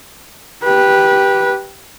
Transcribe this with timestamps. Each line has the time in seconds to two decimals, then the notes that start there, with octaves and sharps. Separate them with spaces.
0.63 G4 B4